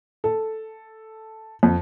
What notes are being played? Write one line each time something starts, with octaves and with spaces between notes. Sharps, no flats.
A4
F2